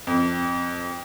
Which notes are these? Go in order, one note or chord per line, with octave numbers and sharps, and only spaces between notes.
F2